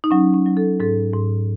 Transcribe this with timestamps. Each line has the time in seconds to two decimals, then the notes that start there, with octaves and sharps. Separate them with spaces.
0.04 D#4
0.11 F#3 C#4
0.34 C#4
0.46 F#3
0.57 A4
0.80 G#2 A4
1.13 G#2